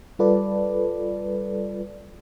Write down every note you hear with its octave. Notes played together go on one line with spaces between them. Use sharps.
G3 F4 A4 B4 D5